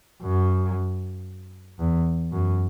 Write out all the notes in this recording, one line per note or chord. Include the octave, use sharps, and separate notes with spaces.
F#2
E2
F#2